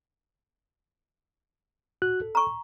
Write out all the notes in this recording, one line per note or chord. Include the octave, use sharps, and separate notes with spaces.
F#4 F#6
A4
A#5 C#6